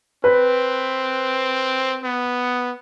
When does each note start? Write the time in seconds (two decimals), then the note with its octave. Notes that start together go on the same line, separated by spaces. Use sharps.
0.24 C4 B4
2.03 B3